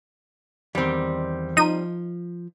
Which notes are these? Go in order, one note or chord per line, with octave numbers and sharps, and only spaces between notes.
E2 D#3 G3 C4
F3 D#4 D#7